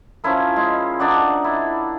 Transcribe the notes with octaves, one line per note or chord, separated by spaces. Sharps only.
F3 C#4 E4 A#4
G#3
D4 D#4 D5 F#5
E4